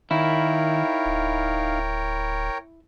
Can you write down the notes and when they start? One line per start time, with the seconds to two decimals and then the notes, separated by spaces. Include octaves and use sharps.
0.11 D#3 D#4 E4 A#4 C#5 F5 G5
1.05 D1